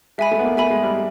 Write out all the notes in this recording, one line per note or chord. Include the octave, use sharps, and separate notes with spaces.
G#3 E5 G#5 B5
A3
B3
A#3
A3 E5 G#5 B5
G#3
G3